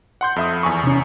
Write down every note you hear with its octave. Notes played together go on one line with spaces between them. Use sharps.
F#5 C6 G6
F2 E5 D#6
E2 G#5 C#6
C3 C#4